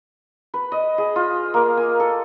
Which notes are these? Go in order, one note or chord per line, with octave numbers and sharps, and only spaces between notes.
B4
D#5
G#4
F4
A#3
G#5
A4